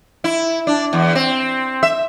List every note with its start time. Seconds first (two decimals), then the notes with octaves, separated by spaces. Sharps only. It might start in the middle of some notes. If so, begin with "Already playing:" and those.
0.24 E4
0.67 D4
0.93 E2
1.15 C4
1.83 E5